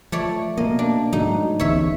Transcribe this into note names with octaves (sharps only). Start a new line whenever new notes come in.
F3 A3 C#5 D5
B2 A#3 D#5
D4
G#2 F#3 A3 D#4
D1 A1 E2 C#5 E5